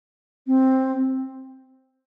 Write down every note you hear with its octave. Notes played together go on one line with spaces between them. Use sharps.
C4